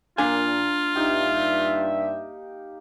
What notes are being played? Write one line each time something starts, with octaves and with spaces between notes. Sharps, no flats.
A#2 A#3 D4 F4 G#5 A#5
G2 D#4 G4 E5